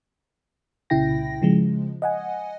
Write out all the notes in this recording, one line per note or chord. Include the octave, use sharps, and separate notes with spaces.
C2 A#2 C#3 E4 G5 A#6
C#3 F3 G#3
D#5 F#5 G#5